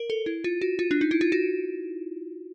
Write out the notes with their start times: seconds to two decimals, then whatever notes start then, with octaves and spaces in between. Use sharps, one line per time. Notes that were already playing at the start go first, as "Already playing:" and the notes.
Already playing: A#4
0.10 A4
0.26 E4
0.44 F4
0.61 F#4
0.79 F4
0.91 D4
1.01 D#4
1.11 E4
1.21 F4
1.32 F#4